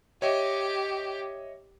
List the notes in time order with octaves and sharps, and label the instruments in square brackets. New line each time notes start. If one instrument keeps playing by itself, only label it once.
[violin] G4 [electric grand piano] C#5 D#5 E5